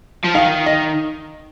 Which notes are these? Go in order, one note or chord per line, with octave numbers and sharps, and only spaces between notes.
F3
D#3 F5
D#5